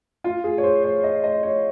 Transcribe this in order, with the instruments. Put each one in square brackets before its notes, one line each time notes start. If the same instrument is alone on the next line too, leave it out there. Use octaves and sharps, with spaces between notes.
[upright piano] F4
G#4
C#5
C5
C#5
D#5
D#5
C#5